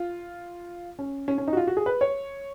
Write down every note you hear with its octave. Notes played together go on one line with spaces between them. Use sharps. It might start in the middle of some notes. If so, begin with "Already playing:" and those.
Already playing: F4
C#4
C#4
C#4
D#4
F#4
F4
F#4
G#4
B4
C#5